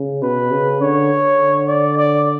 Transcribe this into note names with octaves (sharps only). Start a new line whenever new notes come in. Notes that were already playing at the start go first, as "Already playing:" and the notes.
Already playing: C#3
B2 B4
C#3
D3 C#5
D3
D5
D5